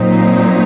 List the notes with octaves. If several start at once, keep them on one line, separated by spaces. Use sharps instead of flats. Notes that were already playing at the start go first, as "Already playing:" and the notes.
Already playing: A#2 F#3 C4 D#4